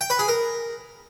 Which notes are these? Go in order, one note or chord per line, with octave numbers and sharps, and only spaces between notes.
G5
B4
G#4
A#4